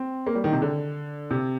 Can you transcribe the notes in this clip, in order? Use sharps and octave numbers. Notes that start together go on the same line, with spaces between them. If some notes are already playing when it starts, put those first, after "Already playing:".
Already playing: C4
A#3
G3
D#3
C3
D3
C3